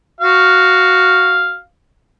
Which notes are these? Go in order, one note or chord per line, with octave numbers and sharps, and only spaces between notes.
F#4 F5